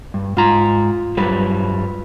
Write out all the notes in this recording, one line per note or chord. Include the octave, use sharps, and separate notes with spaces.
G2
G#2 F4 A#5
G2 F#3 G3 B4